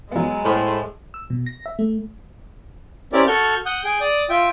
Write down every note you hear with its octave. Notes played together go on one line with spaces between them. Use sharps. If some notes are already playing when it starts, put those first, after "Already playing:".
F#3 G#3 B3
A2 C5
E6
B2
A#6
E5
A3
C4 C#4 E4 G4 A#4 D5
F#4 A4 C#6 F6 G6
F#5 D#6 G6
G#4 G5
D5 D#6
F4 E5 G5